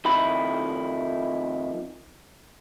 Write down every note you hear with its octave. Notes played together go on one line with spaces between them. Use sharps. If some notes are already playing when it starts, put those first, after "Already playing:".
F2 D#3 E4 B5